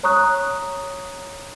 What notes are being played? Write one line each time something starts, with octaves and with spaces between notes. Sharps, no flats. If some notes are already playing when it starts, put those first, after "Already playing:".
C#5 A#5 C#6 D#6 F#6